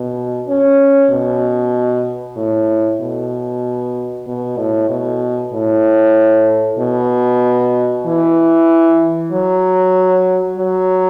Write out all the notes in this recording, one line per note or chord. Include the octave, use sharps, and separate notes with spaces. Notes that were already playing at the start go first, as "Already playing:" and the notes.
Already playing: B2
C#4
B2
A2
B2
B2
A2
B2
A2
B2
E3
F#3
F#3